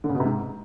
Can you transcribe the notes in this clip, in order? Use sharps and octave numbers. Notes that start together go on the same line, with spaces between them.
D3
C#3
B2
C3
G#2